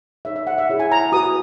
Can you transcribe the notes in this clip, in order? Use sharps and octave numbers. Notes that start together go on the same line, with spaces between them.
D#4 A#4 C#5 E5
E5
F#5
E5
E4 G#4 C#5
G#5
A#5
F#4 B4 D#6